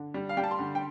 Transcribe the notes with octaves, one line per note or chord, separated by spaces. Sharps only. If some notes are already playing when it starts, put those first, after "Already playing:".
Already playing: D3
G3
F5
G3 G5
A5
C6
D3
G5